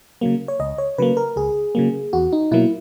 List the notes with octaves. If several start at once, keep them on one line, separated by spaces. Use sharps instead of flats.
C#3 F#3 A#3
C#5
C#2 D#5
C#5
C#3 F#3 A#3 B4
A#4
C#2 G#4
C#3 F#3 A#3
E2 F#4
D#4
B2 F#3 A#3 E4